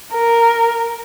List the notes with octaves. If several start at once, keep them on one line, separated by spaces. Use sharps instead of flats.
A#4